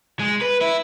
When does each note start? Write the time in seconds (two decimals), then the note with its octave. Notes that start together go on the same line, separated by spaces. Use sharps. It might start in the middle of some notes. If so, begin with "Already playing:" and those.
0.19 G#3
0.41 B4
0.61 E4